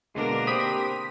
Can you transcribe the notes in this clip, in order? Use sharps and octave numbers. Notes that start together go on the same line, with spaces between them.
B2 D3 G#3 A#3 D4 A#4
C4 G4 C5 B5 D#6 B6